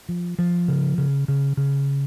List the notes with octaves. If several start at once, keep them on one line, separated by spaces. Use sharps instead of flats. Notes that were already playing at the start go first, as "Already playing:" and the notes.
F3
F3
C#3
C#3
C#3
C#3